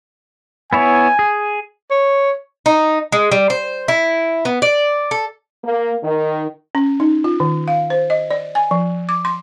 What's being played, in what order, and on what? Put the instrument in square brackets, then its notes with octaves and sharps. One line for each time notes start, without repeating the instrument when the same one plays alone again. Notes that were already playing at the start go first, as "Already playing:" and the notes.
[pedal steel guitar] B3 E4 C#5 [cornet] G#5
[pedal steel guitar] G#4
[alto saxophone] C#5
[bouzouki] D#4
G#3
G3
C5
E4
B3
D5
A4
[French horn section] A#3
D#3
[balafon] C#4
D#4
F4
D#3
F5
C5
D#5
D5
G#5
F3
D6
C6